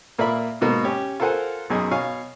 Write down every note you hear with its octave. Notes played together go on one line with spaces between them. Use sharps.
A#2 A#3 D5 E5 B5
G#2 B2 A#3
C#4 G4 C#5
F4 A4 A#4 C5 F#5 G#5
B1 F#2 G#4 D#5
B2 C#5 F5 G#5 C#6